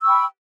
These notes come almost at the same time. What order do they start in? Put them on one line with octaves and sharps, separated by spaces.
E6 C#6 G5 B5